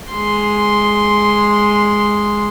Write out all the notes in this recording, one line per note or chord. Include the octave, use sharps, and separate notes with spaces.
G#3 C6